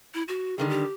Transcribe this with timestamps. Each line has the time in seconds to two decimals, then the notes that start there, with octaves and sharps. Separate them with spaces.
0.14 E4
0.28 F#4
0.58 D3 D#3 G3 G#4
0.69 G4